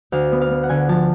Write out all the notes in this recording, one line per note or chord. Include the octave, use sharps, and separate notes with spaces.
D2 F5
B3
F5
B3
F#5
D3 G#5
F3 A5